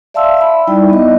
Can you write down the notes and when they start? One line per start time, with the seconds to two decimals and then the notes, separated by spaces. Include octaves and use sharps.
0.14 D5 E5 F5 A5 C6 E6
0.37 E5 B5
0.67 G3 D#4 E4 D5 G5
0.90 B3 D#5